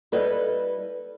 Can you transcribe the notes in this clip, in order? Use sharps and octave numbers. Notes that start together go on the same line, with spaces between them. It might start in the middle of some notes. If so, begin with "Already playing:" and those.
G3 E4 A4 B4 D#5